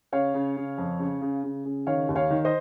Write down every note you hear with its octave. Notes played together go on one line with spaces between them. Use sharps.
C#3 C#5 F5
C#3
C#3
F2
C#3
C#3
C#3
C#3
D#3 C#5 F5
D#2
C#5 F5
D#3
C5 D#5